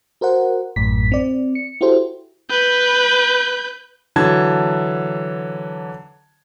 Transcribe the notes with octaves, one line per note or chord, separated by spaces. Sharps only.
F#4 A#4 C5 F#5
A1 F#2 A2 B6
C4 D5
C#7
E4 F#4 G4 A4 C5
B4 G6
D3 E3 F#3 A5 G#6